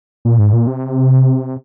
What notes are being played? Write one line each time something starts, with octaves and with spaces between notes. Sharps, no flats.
A#2
G#2
A#2
C3